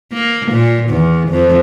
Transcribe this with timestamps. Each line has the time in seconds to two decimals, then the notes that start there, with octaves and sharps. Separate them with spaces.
0.13 A#3
0.52 A#2
0.89 E2
1.30 F2